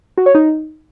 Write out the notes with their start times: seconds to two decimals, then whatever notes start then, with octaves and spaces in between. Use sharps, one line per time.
0.18 F#4
0.26 C#5
0.35 D#4